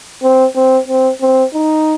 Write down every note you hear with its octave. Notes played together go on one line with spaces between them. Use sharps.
C4
C4
C4
C4
D#4